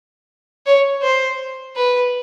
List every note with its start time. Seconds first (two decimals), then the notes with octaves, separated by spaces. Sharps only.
0.66 C#5
1.03 C5
1.76 B4